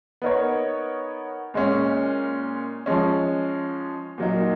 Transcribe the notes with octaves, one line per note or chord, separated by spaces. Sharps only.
B3 D#4 A#4 C#5
A#2 G#3 C#4
F3 G#3 C#4
A#2 F#3 A#3 D#4